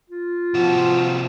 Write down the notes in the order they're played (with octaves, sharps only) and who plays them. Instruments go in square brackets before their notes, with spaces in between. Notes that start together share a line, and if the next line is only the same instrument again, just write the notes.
[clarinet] F4
[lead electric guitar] C3 F#4 [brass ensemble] F3